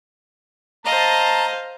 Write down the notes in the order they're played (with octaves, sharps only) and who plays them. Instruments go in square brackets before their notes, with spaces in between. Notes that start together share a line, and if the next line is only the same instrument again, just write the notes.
[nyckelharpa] C5 F5 [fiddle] D#5 [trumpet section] A5 [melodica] A#5